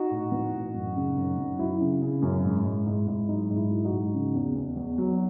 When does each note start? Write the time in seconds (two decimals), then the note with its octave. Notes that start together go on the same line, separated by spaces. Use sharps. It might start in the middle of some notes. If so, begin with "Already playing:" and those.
Already playing: D#4 F#4
0.11 A2
0.32 E3
0.54 A2
0.74 F#2
0.96 C#3
1.17 F#2
1.38 F#2
1.59 F#3 E4
1.80 C#3
2.02 C#3
2.22 F#2
2.44 G#2
2.65 G#2
2.86 G#2
3.07 G#2
3.28 F#3 D#4
3.50 G#2
3.56 E4
3.70 F#3
3.84 D#4 F#4
3.92 G#2
4.14 C#3
4.34 E2
4.56 E2
4.77 E2
4.98 F#3